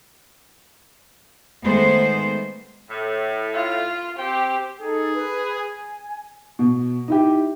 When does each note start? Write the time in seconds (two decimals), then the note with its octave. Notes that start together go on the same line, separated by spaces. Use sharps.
1.64 D#3 G#3 A3 B3 C5
2.90 A2
3.53 F4
4.18 C4 G4 C5 G5
4.79 D#4 G#4 A4
5.15 B4
5.56 G#5
6.59 B2
7.08 D#4 E4 G4